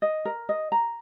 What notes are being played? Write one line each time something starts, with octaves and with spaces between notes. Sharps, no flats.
D#5
A#4
D#5
A#5